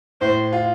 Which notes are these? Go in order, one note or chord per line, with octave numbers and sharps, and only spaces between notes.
A2 C5
F4